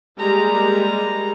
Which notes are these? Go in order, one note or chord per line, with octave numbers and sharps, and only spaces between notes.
G3 G#3 A#3 A#5